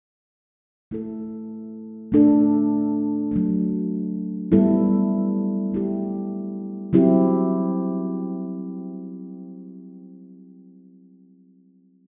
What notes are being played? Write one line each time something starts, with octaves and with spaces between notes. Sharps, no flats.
A3 E4 A4
A3 D4 A4
F#3 A3 D4
G3 B3 E4 A4
A3 E4 G4
F#3 C4 E4 G4